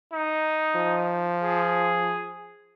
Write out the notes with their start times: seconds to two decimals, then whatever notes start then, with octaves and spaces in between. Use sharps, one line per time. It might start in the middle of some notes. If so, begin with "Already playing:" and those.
0.13 D#4
0.76 F3
1.43 G#4